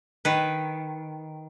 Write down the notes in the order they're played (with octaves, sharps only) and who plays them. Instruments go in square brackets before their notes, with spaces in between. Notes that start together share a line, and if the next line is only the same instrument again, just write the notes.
[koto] D#3 B4